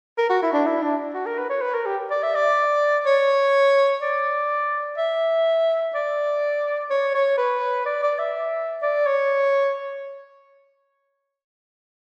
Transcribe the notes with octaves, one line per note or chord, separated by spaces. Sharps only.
A#4
F#4
E4
D4
E4
D4
F#4
A#4
B4
C#5
B4
A#4
G4
D5
E5
D5
C#5
D5
E5
D5
C#5
C#5
B4
D5
D5
E5
D5
C#5